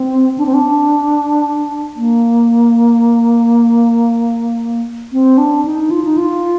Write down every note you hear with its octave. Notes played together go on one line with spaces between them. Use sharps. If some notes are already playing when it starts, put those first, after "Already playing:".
Already playing: C4
D4
C4
D4
A#3
C4
D4
D#4
F4
D#4
F4